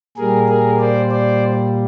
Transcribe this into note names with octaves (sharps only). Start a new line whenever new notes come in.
A#2 G3 G#4 A#4
G#4 A#4
C5 D5
C5 D5